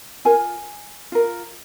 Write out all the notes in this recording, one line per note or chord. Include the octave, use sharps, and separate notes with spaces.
F4 A#4 G#5
F4 A#4